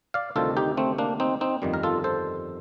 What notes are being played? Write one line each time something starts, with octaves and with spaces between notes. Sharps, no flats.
D5 F5
D2 C3 D#3 G3 F4 A4
D#4 G4
A3 C4
A#3 D4
C4 D#4
C4 D#4
G1 F2 D#3 G3
A#4
F4 A4
A4 C5